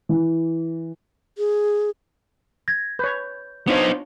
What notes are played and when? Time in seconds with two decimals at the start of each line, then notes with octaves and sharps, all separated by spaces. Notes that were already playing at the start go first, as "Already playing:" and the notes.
0.09 E3
1.38 G#4
2.68 G#6 A#6
2.99 B4 C#5 G6
3.67 B3 D4 D#4 F4 C5 C#5